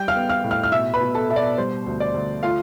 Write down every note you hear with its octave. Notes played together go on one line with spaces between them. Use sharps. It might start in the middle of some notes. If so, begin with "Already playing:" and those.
Already playing: G3 G5 G6
F5 F6
B3
F5 F6
A2
F5 F6
F6
B2 E5 E6
B4 B5
B2
A4 A5
B2 E5
D5
G3 C5
D2
D5
D2
A3 F4 F5